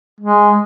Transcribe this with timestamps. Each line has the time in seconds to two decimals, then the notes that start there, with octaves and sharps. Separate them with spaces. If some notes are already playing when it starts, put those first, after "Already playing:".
0.20 G#3